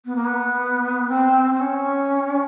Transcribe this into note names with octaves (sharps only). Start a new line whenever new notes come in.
B3
A#3
B3
C4
C4
C#4